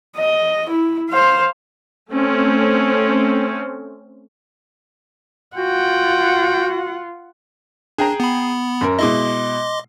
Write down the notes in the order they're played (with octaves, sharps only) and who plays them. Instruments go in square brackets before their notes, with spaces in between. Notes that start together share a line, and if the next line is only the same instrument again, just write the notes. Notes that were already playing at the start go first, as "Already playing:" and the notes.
[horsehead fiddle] D#5
E4
C5 F5
[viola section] A3 C4 C#4
[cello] F4 [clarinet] F#4 [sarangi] F#5 [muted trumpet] G5
[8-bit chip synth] D4 [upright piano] G#4 G5 A#5
[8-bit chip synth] B3 B5
[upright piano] F#2 A#4
[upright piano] B2 G#3 E4 [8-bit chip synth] D#5 C6 D6